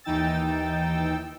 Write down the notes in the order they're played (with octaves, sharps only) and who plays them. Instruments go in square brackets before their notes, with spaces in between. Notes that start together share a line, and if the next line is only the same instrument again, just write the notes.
[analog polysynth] D#2 E3 D#4 G5 E6 A6